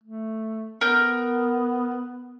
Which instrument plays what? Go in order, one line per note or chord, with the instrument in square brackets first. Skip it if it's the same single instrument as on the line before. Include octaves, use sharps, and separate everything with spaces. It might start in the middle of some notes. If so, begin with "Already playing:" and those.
[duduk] A3
[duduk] B3 [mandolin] A#4 G6